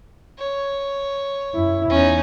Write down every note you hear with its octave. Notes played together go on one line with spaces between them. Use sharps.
C#5
F#2 E4
E2 C#4 D#4